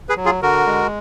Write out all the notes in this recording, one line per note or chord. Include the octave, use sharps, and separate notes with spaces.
G#4 B4
F#3
F4 G#4
D3 F#4 A#4
G#3